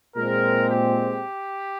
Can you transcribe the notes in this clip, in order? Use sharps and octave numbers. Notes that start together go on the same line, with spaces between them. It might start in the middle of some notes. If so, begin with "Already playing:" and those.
A#2 G#3 C4 A#4
G4